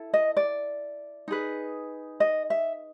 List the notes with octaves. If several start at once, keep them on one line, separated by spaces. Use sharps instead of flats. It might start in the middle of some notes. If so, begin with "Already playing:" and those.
Already playing: E4 A4
D#5
D5
D#4 G#4 B4
D#5
E5